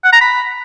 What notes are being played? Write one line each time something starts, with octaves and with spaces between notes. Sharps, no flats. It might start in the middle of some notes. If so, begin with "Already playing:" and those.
F#5
A#5
B5